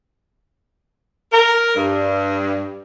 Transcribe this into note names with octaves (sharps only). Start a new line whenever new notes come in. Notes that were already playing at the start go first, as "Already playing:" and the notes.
A#4
G2